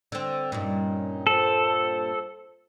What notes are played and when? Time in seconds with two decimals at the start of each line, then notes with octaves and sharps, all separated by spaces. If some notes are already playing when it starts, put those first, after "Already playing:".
0.12 D3 C4
0.52 G2 A#2 C#4 D#4
1.27 F4 A4 C5